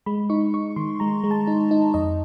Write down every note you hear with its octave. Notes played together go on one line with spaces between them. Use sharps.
G#3 B5
D#4 C#6
D#4 C#6
D#3 C6
G#3 A#5
G#3
A5
D#4
D#4
F2 D#5